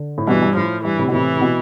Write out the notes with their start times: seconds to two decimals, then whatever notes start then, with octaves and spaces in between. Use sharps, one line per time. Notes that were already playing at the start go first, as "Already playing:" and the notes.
Already playing: D3
0.18 A2
0.28 G2 B2 E3
0.42 G2
0.56 A2 F3
0.84 G2 E3
0.99 A2 C3
1.08 B2
1.13 A2 C3 E3
1.36 C3
1.41 B2